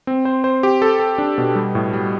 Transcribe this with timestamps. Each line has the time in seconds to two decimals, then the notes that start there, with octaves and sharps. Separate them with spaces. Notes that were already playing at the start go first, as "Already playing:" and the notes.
0.07 C4
0.25 C5
0.44 C5
0.63 G4
0.82 A4
0.99 A4
1.18 D4
1.38 B2
1.55 G3
1.75 A2
1.93 G3